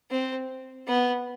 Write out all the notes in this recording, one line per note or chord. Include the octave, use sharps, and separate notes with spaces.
C4
B3